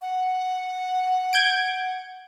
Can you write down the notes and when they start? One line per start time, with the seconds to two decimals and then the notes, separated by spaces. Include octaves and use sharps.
0.02 F#5
1.33 G6 G#6 D7